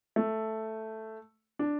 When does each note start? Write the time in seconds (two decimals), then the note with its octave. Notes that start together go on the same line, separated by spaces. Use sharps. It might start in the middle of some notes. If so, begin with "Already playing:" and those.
0.16 A3
1.59 D4